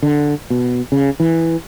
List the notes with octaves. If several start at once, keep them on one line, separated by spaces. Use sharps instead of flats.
D3
B2
C#3
E3